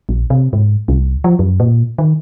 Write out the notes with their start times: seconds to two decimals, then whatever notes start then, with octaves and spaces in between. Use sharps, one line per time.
0.09 A#1
0.30 C3
0.53 G#2
0.88 C2
1.24 F3
1.39 F#2
1.60 A#2
1.98 D#3